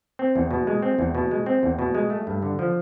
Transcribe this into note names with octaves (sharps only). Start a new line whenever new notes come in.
C4
E2
B2
G#3
C4
E2
B2
G#3
C4
E2
B2
G#3
A3
G2
D3
F3